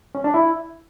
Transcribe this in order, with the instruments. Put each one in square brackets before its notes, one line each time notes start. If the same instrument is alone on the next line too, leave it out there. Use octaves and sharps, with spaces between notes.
[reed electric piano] C#4
D4
E4